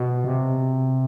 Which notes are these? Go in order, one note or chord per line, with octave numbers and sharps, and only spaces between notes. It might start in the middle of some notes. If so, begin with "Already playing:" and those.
Already playing: B2
C3